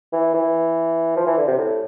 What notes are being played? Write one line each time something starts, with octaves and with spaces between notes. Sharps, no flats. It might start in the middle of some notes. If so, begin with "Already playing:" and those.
E3
E3
F3
E3
D3
C3
A2